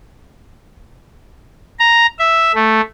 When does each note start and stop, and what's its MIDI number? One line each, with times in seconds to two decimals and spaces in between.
1.79 2.06 82
2.19 2.52 76
2.55 2.81 57